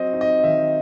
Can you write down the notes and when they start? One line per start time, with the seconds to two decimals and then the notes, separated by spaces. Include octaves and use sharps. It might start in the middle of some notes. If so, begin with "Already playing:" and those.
Already playing: F#3 C4 D#5
0.13 D#4
0.21 D#5
0.44 D#3 E5